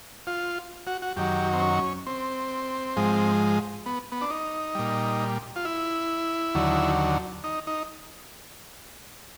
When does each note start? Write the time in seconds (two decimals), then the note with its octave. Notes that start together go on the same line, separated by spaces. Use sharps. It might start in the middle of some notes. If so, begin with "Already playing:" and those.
0.27 F4
0.87 F#4
1.02 F#4
1.16 F#2 D#3 F#3 G4
1.53 C4
1.62 C#4
2.07 C4
2.97 G#2 F3 G#3
3.86 B3
4.12 B3
4.21 D4
4.30 D#4
4.75 A#2 G3
5.56 F4
5.65 E4
6.55 D#2 D3 F#3
7.44 D#4
7.67 D#4